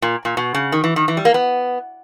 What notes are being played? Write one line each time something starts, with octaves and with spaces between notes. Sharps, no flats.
A#2
A#2
B2
C#3
D#3
E3
D#3
E3
G3
A#3
B3